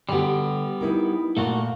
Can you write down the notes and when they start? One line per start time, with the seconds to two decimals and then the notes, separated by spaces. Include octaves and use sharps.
0.09 D3 G3 B3 G4
0.81 D#4 E4 A#4
1.37 A#2 A3 A#3 F#4